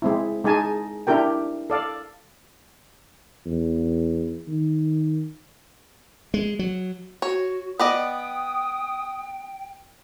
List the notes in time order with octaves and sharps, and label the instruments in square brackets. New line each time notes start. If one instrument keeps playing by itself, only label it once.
[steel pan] G#3 C4 E4
G#3 D#4 G#4 G#5 A5
D4 E4 G4 A#4 G5
A4 D5 F5
[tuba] E2
D#3
[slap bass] G#3
F#3
[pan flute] F#4 [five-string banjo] C#5
[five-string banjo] B3 D5 D#5 [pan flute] G5 [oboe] D#6